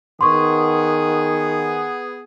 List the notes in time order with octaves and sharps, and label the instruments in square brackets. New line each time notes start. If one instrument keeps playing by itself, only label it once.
[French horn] D#3 [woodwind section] B3 G#4 [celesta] C6 C#6